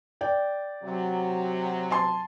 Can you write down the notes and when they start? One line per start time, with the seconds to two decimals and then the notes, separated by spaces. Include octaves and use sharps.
0.21 D5 G5
0.83 C3 F#3
1.90 G#5 A5 C6